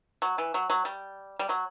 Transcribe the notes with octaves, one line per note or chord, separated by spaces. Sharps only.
F#3
E3
F#3
F#3
G3
G3
F#3